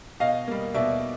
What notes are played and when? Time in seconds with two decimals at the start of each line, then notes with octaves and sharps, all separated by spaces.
0.20 B2 D#5 F5
0.48 G3 A#3
0.74 B2 D5 E5